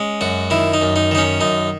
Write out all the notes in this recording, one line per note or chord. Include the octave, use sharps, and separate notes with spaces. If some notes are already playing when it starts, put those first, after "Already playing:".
Already playing: G#3 C#4
F#2 F#4
D#3 E4
D#4
F#2
D#4
D#3 D#4
C#4
F#2 D#4